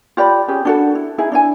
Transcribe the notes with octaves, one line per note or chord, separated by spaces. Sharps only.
F4 G4 D5 B5
C#4 G4 G#4
D4 F#4 A4
E4
D#4 E4 G#4
D4 E4 G#5